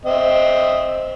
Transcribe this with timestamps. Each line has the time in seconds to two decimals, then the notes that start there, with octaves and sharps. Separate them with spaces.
0.05 C4 D#5 E5